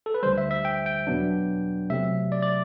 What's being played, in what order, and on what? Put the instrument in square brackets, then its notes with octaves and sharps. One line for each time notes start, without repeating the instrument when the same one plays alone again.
[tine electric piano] A4
B4
G3 C5
D2 D3
E5
E5
G5
G5
E2 B2 F#3 B3 D4
C3 F#3 A3 E5
D5
D5